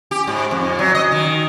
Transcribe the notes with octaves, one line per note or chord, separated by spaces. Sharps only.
G4
G#2
F2
F#3
D#5
D#3